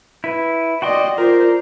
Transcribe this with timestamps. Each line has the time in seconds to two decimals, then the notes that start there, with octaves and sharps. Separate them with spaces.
0.24 E4 B4
0.82 F#4 D5 D#5 G5 C6
1.18 F4 A#4 C5 D5